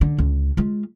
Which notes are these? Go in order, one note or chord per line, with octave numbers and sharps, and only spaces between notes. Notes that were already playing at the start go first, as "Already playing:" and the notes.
D3
C#2
G#3 F4